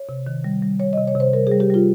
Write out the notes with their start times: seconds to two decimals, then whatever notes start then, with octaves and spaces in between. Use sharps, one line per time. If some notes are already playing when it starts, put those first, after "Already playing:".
Already playing: C#5
0.09 C3
0.27 D#3
0.44 G3
0.62 G3
0.80 G3 C#5
0.93 D#5
0.98 C3
1.07 C#5
1.15 C3 C5
1.33 G3 A#4
1.47 G#4
1.52 G3
1.60 G4
1.70 G3 F4